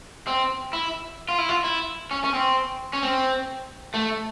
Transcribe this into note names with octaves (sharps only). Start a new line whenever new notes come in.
C4
E4
F4
E4
F4
E4
C#4
C#4
C4
C#4
C4
A3